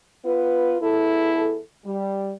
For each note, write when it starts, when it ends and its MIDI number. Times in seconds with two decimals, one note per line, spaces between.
0.25 0.75 59
0.25 0.75 65
0.25 0.75 71
0.81 1.60 40
0.81 1.60 64
0.81 1.60 69
1.85 2.32 55